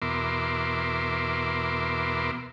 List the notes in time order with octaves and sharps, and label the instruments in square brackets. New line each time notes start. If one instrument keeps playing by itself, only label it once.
[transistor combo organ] E2 B2 A#4 E5 C6 D6